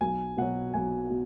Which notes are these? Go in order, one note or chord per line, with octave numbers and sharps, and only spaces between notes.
B1 G#5
B2 F#3 F#5
B1 G#5
B2